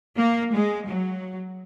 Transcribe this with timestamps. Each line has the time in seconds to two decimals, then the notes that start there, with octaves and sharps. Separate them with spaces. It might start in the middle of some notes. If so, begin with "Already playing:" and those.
0.18 A#3
0.53 G#3
0.87 F#3